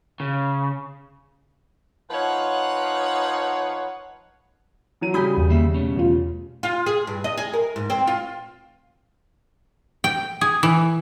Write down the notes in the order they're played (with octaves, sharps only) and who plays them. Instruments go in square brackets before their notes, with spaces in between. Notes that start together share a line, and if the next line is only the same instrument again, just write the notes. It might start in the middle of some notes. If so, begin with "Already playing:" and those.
[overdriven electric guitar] C#3
[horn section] F3 D#4 B4 C#5 F5 F#5
[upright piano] E3 F#3 D#7
[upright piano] C#3 G3 [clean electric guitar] F#4 G#5 [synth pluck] B5 D#6 G6
[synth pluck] E2
[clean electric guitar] D#3 A#3 E5
B2 A3 C#4
[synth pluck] E2 F4
[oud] F4
G#4
G2
D#5
G#4
A#4
G#2
C4
F4
[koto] G5
G#4
E3